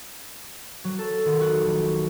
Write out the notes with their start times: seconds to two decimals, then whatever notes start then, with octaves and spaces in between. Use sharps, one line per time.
0.84 F#3
0.99 A4
1.25 D#3
1.41 F#4
1.63 A#1